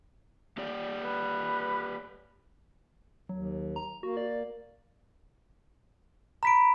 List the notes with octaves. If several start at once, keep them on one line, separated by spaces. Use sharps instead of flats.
A#3 G4 D5
B4
D#2 F#3
A#5
A#3 F#4
D5
A#5 B5 B6 D7